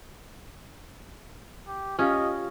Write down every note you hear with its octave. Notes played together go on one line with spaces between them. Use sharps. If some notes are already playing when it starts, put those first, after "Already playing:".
G4
C#4 F4 G4 D#5 F5